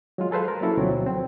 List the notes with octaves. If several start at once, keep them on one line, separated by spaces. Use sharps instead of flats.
F#3 G#3 F4
G#4 A4 B4 C5 F5
A#4
F#3 A#3 C#4 E4 A4
D2 B2 F3 F#3 C4
C4